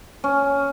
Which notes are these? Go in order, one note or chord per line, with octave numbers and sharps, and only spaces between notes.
C#4